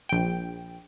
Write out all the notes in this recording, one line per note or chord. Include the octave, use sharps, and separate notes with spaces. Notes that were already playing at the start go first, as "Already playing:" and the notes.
A#1 G5